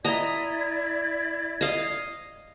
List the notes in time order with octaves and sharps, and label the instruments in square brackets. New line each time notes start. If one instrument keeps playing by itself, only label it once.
[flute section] E4 D5 G#6 [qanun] D#5 A#5
[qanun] D#5 F5